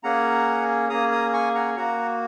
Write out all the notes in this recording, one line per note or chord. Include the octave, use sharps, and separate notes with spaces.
A#3 C#4 G#4 F#5 A#5
A#3 C#4 G#4 A#5 D#6
A#5 D#6
G#5 C#6
F#5 A#5
A#3 F#4 F#5 A#5